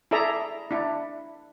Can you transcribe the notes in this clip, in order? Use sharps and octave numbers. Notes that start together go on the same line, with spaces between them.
E4 G#4 A4 D5 E5 A#5
D4 E4